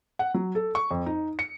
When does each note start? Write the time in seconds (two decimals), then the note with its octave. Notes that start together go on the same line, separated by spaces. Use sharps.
0.19 F#5
0.34 F#3
0.55 A4
0.75 C#6
0.91 F2
1.06 D#4
1.39 C#7